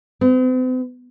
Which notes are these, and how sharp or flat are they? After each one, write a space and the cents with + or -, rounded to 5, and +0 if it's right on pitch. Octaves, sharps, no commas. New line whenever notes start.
C4 -45